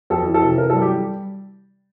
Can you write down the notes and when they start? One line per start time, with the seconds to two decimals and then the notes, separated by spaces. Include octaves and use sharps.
0.10 F2 A4
0.26 E3
0.34 A4
0.42 C3
0.58 E3 A#4
0.70 A4
0.73 G3
0.82 G4